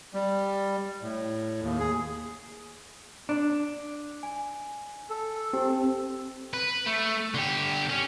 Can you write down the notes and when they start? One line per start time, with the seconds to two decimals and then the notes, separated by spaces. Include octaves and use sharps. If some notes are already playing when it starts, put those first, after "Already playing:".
0.14 G3
1.02 A2
1.61 D#2
1.79 G#4
3.29 D4
4.23 G#5
5.10 A4
5.53 C4 G4
6.53 B4
6.86 A3
7.34 D3 G4
7.89 C#4